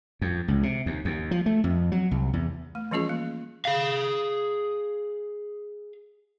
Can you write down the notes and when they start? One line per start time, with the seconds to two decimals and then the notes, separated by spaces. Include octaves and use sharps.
0.21 F2
0.48 C#2
0.63 C3
0.86 D#2
1.05 D#2
1.31 F3
1.46 A3
1.64 F2
1.92 F#3
2.11 C2
2.33 E2
2.75 A3
2.91 E3 F3 G3 C#4 F4 G#4
3.09 A#3
3.65 G#4 F5